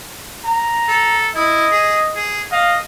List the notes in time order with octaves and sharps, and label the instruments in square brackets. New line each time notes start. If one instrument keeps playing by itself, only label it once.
[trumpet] A#5
[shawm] A4
[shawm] E4 [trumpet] D#5
[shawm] G#4
G#4
[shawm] D#5 [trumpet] F5